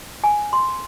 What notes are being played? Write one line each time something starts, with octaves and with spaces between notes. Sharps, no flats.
G#5
C6